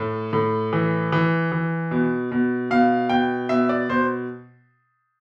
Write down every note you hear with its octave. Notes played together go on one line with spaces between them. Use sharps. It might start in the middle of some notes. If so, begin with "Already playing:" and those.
Already playing: A2
A2
E3
E3
E3
B2
B2
B2 F5
B2 G5
B2 E5
D5
B2 C5